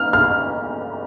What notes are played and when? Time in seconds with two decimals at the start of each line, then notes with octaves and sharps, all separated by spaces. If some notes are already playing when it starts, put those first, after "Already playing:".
Already playing: F6
0.13 F6